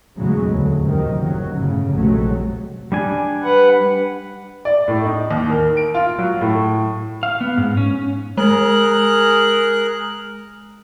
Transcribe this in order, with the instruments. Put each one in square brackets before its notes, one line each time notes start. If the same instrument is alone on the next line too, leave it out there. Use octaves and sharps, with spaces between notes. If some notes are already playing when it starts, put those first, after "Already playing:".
[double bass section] E2 A2 C#3 F#3 G#3
D2
F#2 C3 D#3
F#1 F#3
G1 A2 C#3
F1 A#1 C3 F#3 G#3 A3
[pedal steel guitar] G3 D4 G#5
[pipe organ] B4 F#5
[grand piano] D5
A2
D#4
D#2
A#4
D7
F4
F#3
A2
[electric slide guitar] F5
B3
G#2
C#4
[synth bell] G#3 [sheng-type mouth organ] G#4 A#4 F#6